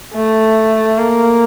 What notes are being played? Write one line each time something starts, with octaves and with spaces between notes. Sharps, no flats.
A3
A#3